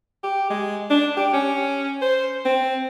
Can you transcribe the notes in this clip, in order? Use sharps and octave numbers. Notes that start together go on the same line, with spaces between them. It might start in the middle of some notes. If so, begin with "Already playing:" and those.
G4
G#3
D4
G4
C#4
C5
C4